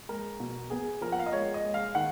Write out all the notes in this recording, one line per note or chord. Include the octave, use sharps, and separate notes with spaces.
G#3 A#4
B2
B3 G#4
F3 A#4
F#5
F5
D#5
G#3 C#5
D#5
G#3
F5
D#3 F#5